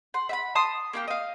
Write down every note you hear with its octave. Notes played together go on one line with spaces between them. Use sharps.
F#5 C6
E5 F#5 B5
A5 C6 D#6
A#3 E4 G4
D#5 F5